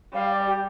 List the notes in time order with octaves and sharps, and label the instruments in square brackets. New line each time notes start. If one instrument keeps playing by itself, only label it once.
[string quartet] G3 [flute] F5
[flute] D5
G4